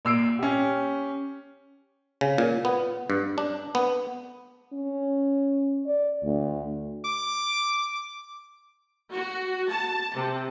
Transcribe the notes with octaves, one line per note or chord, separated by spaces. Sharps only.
A#2 E6 C7 D7
C#4 G4
C#3
A#2
B3
G2
D4
B3
C#4
D5
D2
D6
F#4
A5
C3